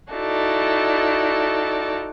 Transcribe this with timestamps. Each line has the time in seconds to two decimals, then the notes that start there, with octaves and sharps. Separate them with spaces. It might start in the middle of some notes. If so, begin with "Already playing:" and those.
0.10 D#4 E4 F#4 A4 D5